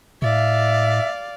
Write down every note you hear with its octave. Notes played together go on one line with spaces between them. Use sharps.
A2 D5 E5 F5